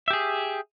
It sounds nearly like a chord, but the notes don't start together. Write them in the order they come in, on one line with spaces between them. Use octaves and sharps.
E5 G4 G#4